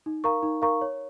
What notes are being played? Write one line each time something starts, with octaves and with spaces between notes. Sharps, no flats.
D#4
A#4 F5 A#5 C#6
D#4
A#4 F5 A#5 C#6
C#5